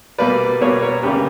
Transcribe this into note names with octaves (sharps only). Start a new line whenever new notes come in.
B2 G3 A#3 B4 D5
B2 G3 A#3 A#4 C#5
A#4 C#5
D2 C#3 G3 A#3 G4 B4